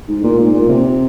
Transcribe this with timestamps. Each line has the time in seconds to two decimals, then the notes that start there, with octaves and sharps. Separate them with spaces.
0.08 G#2
0.23 A#2
0.39 G#2
0.53 A#2
0.68 C3